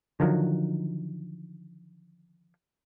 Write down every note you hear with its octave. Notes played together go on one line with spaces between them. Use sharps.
D3 D#3 F3 F#3